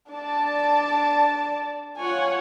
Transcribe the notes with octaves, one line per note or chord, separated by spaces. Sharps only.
D4 D5 A5
F4 C#5 F#5 G#5